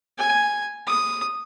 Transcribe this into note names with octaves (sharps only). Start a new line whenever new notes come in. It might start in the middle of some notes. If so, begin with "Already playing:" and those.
G#5
D#6